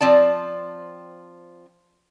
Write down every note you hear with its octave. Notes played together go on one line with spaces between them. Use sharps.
F3 C4 D5 A5